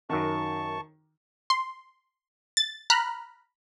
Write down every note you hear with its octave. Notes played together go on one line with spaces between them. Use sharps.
F#2 D#3 F#4 A#4 A5 C#6
C6
A6
A#5 B5 F6 F#6